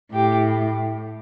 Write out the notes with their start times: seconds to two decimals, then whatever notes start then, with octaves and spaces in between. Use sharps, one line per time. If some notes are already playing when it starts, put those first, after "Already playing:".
0.13 A2 G4